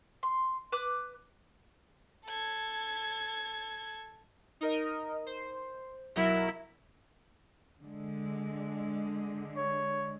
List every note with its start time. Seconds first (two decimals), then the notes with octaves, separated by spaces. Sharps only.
0.23 C6
0.72 B4 D6 F#6
2.25 A4 G#6
4.61 D#4 A#4 D#5
5.26 C5
6.15 B1 F#3 E4 A#4
7.80 D3 G#3
9.57 C#5